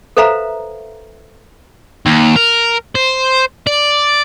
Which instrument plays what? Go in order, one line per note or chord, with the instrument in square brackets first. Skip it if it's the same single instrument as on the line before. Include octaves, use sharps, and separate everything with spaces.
[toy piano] A4 B4 C5 E5 F5 A#5
[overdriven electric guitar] D#2
A#4
C5
D5